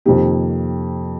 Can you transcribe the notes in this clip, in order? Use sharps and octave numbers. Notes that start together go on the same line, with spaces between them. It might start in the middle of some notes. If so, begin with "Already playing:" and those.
F2 C3 D#3 A#3 G4